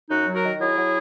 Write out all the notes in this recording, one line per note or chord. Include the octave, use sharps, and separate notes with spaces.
F#2 D#4 F#4
F#3
F#4 A#4
D#3
F#3 E4 G#4
F#3